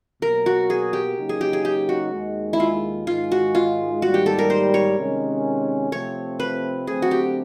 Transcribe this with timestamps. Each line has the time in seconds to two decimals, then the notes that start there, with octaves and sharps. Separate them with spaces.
0.22 B2 F#3 A#3 A#4
0.46 F#4
0.70 G#4
0.93 G4
1.17 C#3 F#3 A#3 D#4
1.29 G#4
1.41 G4
1.53 G#4
1.65 G4
1.89 F#4
2.12 D#2 D#3 G#3
2.53 E4
2.60 F4
3.07 G#2 D#3 G#3 F4
3.32 F#4
3.55 F4
4.02 G#2 D#3 G3 A#3 F#4
4.14 G4
4.26 A4
4.39 A#4
4.50 C5
4.74 C#5
4.97 C3 D#3 G#3 C#4
5.92 C3 F3 A3 C4 C#5
6.40 B4
6.87 D3 F#3 A3 C4 G#4
7.02 F#4
7.11 G4